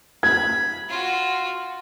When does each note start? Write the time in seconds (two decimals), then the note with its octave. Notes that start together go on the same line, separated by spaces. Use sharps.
0.23 B5 G#6
0.89 F4 F#4